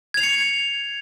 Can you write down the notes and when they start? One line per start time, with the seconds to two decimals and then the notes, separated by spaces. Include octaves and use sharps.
0.14 G#6
0.17 F7
0.20 C7
0.23 C#7